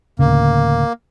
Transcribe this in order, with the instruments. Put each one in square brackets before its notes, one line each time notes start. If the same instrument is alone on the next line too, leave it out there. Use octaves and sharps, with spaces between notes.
[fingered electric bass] D1 D2 C#3 [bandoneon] A#3